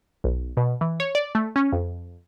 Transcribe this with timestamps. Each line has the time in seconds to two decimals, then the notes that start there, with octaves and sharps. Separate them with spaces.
0.24 B1
0.57 B2
0.81 E3
1.00 C#5
1.15 D5
1.35 A3
1.56 C#4
1.72 F2